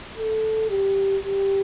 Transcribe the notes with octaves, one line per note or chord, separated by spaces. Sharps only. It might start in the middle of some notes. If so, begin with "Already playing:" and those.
A4
G4
G4